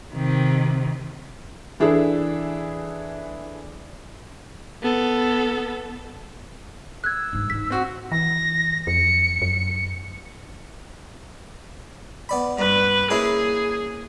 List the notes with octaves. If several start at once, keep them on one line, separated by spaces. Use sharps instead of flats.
C3 D#3
E3 D4 E4 G#4 A4
B3 A4
E6 F#6 G#6
G#2 G#3
G#2 D#4 B6
C4 F#4
E3 A#6
F2 C#7
F#2
B3 D5 B5
G2 B4
A#3 C#4 E4 G#4